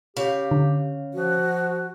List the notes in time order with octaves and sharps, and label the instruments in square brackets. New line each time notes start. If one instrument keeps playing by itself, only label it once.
[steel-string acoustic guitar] C#3 F5 [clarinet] G4
[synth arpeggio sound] D3
[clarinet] F3 [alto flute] F#4